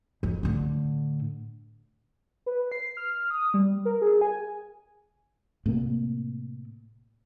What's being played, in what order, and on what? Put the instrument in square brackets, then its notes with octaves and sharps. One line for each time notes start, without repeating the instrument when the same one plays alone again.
[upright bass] F2
A2 D3
[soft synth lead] B4
C7
F6
D#6
G3
A#4
G#4
G#5
[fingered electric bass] A2 C3 A#3